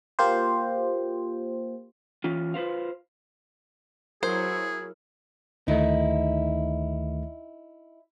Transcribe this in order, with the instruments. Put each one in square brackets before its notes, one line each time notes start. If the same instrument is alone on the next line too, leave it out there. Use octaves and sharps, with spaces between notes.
[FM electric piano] A#3 F4 G4 C5
[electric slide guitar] E3 C#4 F4
F4 B4 C5 F5
[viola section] F#3 E4 [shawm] G#4 [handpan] A#4 [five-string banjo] C5
[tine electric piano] D2 D#3 A3 [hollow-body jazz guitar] D#4 E4